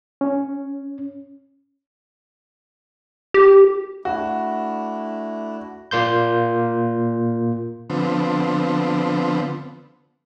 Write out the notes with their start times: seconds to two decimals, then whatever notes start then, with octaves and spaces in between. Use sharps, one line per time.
0.21 C#4
3.34 G4
4.05 A3 D4 E4 F#4
5.91 A#2 A#3 C6 G6
7.90 D3 F3 B3 C4